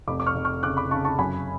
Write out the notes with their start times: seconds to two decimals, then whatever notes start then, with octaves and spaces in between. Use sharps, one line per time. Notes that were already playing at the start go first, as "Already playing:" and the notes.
0.08 F1 B5 D6
0.20 D6
0.27 C#6 F6
0.35 F1
0.45 C#6 F6
0.63 C#3 D6 F#6
0.77 B5 D6
0.91 C#3 A5 C#6
1.05 A5 C#6
1.19 F#2 G#5 B5